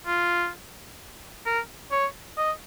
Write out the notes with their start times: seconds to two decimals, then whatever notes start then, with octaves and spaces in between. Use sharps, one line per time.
0.06 F4
1.45 A#4
1.91 C#5
2.37 D#5